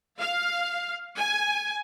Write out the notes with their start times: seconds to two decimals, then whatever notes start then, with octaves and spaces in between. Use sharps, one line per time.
0.19 F5
1.17 G#5